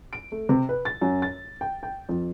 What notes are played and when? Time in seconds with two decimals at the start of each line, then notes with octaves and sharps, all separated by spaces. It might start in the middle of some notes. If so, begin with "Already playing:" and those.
0.13 D7
0.32 A3
0.49 C3
0.69 B4
0.85 A6
1.01 F#2
1.22 A6
1.61 G5
1.83 G5
2.09 F2